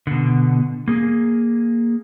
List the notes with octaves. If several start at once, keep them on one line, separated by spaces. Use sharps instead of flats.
B2 D3
A#3 G#4